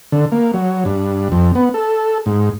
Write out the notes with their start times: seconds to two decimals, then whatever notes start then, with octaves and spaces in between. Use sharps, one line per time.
0.12 D3
0.32 A#3
0.54 F#3
0.85 G2
1.32 F2
1.55 B3
1.74 A4
2.26 G#2